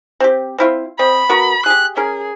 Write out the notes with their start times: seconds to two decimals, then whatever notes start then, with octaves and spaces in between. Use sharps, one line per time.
0.20 C4 G4
0.58 C4 E4 F4
0.99 C4 D#5 B5
1.29 B3 F#4 A#4
1.66 G4 G#4 F#6
1.97 C#4 G#4 A#4